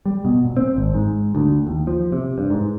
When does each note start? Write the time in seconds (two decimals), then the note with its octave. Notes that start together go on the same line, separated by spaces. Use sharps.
0.06 G3
0.25 B2
0.45 A#2
0.57 C4
0.76 G#1
0.94 G#2
1.35 D2
1.67 D#2
1.87 F3
2.12 C3
2.38 G2
2.50 G#2